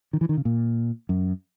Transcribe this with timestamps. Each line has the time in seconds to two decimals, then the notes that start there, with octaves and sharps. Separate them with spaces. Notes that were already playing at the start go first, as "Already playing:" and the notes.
0.13 D#3
0.21 E3
0.29 D#3
0.37 C#3
0.45 A#2
1.09 F#2